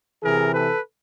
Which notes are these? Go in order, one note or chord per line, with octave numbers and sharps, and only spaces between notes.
C3 E3 G#4 A#4
A4 B4